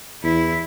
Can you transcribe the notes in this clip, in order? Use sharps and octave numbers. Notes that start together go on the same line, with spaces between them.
E2 E4